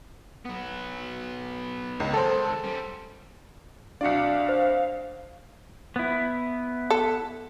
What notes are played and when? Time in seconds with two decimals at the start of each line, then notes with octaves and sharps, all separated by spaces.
0.45 F#3 B3
2.00 C#2
2.13 D#3 G#3 A4 C5
2.64 G3 C#4
4.01 C2 D4 F#4 D5 F5 C#7
4.49 C5
5.96 B3 E4
6.90 A4